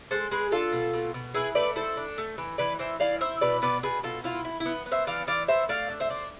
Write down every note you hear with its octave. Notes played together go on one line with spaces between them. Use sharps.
G#3 A4 C5
G#3 G#4 B4
D4 F4 A4
B2
B2
B2
E4 G#4 B4
A3 B4 D5
E4 A4 C5
D4
A3
E3
E3 B4 D5
E3 C5 E5
E3 D5 F5
E4 C5 E5
B2 B4 D5
B2 B4 D5
B2 G#4 B4
B2 F4 A4
E4 F4
E4
E4
B3
B3
C5 E5
E3 D5 F5
E3 D5 F5
B3 C5 E5
A3 D5 F5
D4
C5 E5
D4